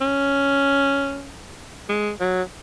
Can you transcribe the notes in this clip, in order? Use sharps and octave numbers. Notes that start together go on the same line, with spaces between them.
C#4
G#3
F#3